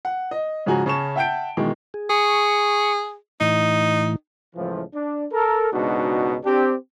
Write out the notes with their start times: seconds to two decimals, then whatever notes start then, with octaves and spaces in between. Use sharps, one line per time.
0.05 F#5
0.31 D#5
0.66 G#2 C#3 F3 F#4 G#5 A#5
0.86 C#3 C#4 A5 C#6 E7
1.16 E5 F#5 G5 A5 G6 D7
1.57 B2 D#3 E3 G#3
1.94 G#4
2.10 G#4 C#6
3.41 A2 E3 D#4
4.56 C#2 A2 E3 F3
4.94 D4
5.32 A4 A#4
5.73 C#2 G#2 B2 D4 D#4 F#4
6.44 C4 D4 G4